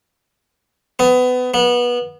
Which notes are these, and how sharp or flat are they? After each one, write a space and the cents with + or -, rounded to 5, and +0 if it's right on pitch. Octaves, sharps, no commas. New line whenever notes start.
B3 +25
B3 -25